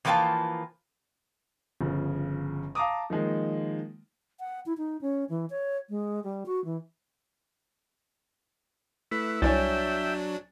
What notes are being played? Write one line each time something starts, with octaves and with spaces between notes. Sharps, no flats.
E3 F3 A#3 F4 G5 A5
G1 C#3 F3
F5 A5 A#5 D6 D#6
D#3 F3 G#3 A#3
F#5
E4
D#4
C#4
E3
C#5
G#3
G3
F#4
E3
A3 E4 B4
C2 F#3 D4 C#5 E5 G5 G#5 A6